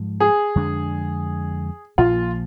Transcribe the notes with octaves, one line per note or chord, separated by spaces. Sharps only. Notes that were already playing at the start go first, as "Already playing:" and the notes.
Already playing: G#2 F3 G#3
G#4
F2 D3 G#3 D4
A#1 A#2 F3 A#3 F4